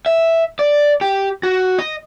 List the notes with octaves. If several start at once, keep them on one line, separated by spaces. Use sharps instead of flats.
E5
D5
G4
F#4
D#5